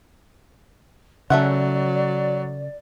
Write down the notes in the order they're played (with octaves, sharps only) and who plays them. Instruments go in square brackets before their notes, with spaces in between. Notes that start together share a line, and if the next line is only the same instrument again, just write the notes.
[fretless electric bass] C#3 [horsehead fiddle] F#3 [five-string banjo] A3 E5 F#5 [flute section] D5